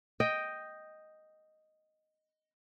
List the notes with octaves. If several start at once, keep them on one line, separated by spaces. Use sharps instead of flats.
D#5 G5